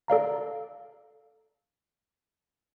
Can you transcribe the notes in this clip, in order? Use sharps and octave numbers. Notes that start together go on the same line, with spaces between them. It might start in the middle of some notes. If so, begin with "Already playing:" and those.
A4 D5 F5 A#5